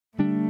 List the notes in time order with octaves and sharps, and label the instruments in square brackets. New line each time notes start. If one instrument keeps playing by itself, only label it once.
[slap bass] D3 G3 D4 [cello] A3